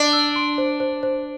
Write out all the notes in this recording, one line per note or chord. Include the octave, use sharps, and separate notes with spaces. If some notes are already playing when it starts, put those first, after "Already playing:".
Already playing: D4
E6
C6
C5
C5
C5